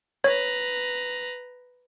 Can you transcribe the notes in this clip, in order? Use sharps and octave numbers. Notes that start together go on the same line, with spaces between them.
B4 C#5 A#5